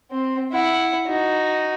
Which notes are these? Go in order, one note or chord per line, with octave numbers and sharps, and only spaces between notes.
C4
E4 F#5
D#4 F#4